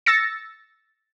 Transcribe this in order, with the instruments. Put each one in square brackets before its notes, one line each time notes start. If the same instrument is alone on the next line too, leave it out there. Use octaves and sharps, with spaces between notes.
[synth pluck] E6 A6 A#6 C#7